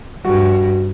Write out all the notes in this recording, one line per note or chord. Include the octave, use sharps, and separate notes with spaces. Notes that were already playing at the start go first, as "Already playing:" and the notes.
G2 F#4